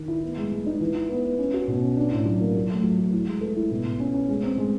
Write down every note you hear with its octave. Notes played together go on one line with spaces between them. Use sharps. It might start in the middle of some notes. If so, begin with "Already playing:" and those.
Already playing: D#3
E4
B3
G#3
G#3
D#4
E3
E4
B3
B3
C#4
F#4
B2
C#4
D4
A2
F#3
A#3
F#3
A3
F#3
A3
E4
G#3
A4
E4
B2
B2
C#4
C#4
G#3
C4
G#3